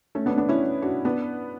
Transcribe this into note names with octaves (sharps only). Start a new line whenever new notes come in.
A3 C#4
B3 D4
B3 D4
C#4 E4
D4 F#4
B3 D4